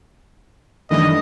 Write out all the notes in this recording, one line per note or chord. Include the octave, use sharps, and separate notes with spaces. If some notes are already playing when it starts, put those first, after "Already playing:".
F#2 D#3 E3 G3 A3 D4 D#5